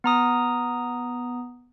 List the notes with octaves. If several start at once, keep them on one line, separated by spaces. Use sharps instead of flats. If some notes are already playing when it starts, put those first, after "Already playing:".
B3 A#5 D#6